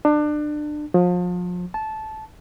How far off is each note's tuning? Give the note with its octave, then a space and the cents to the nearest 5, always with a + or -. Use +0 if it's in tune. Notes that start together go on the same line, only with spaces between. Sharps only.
D4 +30
F3 +35
A5 -15